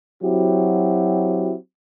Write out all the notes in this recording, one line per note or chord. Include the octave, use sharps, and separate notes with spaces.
F#3 C4 E4 F#4 G4